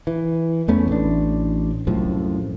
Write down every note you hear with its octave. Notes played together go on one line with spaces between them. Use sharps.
E3
E2 A3 B3 C#4
A1 D4
C2 F#2 A2 F3